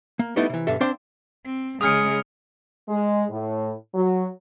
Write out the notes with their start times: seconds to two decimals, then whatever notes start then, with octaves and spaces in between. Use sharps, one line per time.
0.19 A#3
0.36 G3 A3 B3 D#4 E4
0.49 C3 E3
0.67 B1 G2 D3 A4 E5
0.81 C4 D4 C5 F5 G5 C6
1.46 C4
1.81 C#3 G#3 G#4 D#6 F6 C#7
2.89 G#3
3.30 A2
3.95 F#3